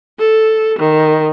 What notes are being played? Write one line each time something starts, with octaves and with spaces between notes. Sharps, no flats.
A4
D#3